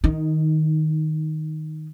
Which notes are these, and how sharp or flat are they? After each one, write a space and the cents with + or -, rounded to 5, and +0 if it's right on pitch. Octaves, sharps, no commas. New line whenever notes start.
D#3 +0 D#4 +20